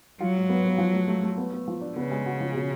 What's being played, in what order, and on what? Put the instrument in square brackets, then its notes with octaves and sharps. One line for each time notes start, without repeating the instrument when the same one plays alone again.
[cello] F#3 [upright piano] F4
[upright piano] G#2
B3
B3
F3
A3
A3
A3
B3
B3
F3
D4
[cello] C#3 [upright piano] B3
[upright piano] G#3
F#4
F3
B2